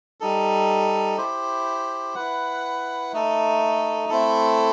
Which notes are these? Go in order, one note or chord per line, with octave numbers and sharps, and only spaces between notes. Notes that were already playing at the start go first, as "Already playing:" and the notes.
G3 D#4 A4
E4 G4 C5
E4 B4 F#5
A3 D#4 A4
A3 C4 E4 A4